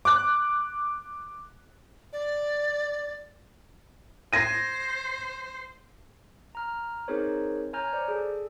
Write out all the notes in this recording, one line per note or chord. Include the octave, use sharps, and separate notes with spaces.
D6 F#6
D5
C5 G#6 A#6 D#7
A#5 F6
C4 D#4 G#4 A#4 C5 C#5
C#5 G#5 A#5 F6 G6
C5 D5
G#4 A4